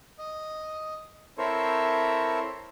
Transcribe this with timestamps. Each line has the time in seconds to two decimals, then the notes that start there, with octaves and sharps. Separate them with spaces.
0.19 D#5
1.38 C4 E4 A4 A#4 C5 C#5